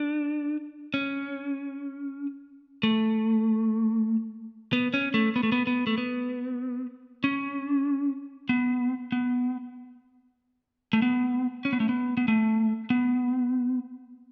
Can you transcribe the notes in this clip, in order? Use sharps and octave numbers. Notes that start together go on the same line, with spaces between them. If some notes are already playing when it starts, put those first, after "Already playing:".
Already playing: D4
C#4
A3
B3
C#4
A3
B3
A3
B3
B3
A3
B3
C#4
B3
B3
A3
B3
C#4
B3
A3
B3
B3
A3
B3